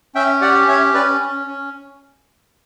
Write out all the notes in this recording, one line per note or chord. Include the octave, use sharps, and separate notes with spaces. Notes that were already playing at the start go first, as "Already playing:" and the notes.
C#4 E5 G5
G4 D5 F#5
C#4 C#5 E5
C#4 B4 D5
C#4
C#4